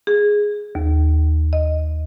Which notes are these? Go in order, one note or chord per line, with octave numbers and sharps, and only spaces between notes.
G#4
D#2
D#5